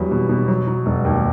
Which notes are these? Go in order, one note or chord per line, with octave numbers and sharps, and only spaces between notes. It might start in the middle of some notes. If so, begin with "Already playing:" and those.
Already playing: E2 F#3 G3
B2
B2
F#3
F#3
E1
D#2